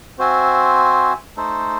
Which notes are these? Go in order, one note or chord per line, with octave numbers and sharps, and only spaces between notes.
C4 F#4 C5 E5 G#5
A3 D#4 A4 C5